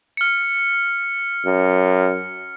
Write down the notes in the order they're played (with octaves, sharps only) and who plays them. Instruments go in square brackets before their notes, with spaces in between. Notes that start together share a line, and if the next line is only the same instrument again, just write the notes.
[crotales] F6 C#7
[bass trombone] F#2